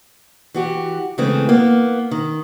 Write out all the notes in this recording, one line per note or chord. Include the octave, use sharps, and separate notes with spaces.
E3 F#4 G4
C#3 E3 G#3 A3 C4
A#3 B3
D#3